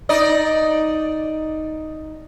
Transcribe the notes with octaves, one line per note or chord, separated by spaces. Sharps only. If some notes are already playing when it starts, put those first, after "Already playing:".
D#4 D5 D#5